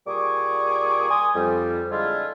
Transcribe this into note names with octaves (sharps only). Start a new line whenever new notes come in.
A#2 G3 G#4 C#6 D6
G#5 C6 D#6
F2 G3
D3 G#3 E4 F4